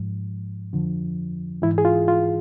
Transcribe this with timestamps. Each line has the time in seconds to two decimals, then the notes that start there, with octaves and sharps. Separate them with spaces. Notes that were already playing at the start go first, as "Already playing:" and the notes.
Already playing: G#2 F3
0.73 F2 D3 F3
1.62 G#2 E3 E4
1.78 G#4
1.85 F4
2.08 F4